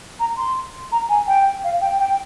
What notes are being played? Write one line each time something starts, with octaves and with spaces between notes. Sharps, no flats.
A#5
C6
A#5
G#5
G5
F5
G5
G5